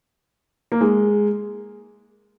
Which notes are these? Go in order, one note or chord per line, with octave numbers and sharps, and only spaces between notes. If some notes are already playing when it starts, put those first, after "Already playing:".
A#3
G#3